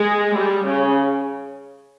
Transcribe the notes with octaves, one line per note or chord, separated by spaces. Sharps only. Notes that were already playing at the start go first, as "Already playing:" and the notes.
Already playing: G#3
G3
C#3